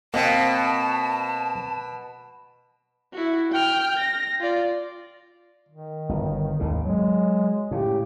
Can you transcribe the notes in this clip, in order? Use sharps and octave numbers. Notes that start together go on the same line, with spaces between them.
B2 A#3 C4 F5 A5
E4 F#4
G5 F6
A#6
F4 D5
D#3
G1
G#1 D#2 C#3
F#3 G#3
A2 C#3 G4